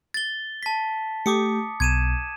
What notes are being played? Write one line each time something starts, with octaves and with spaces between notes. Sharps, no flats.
A6 G7
A5 B6
A3 G4 D6 D#6 C#7
B1 G#6 D#7 E7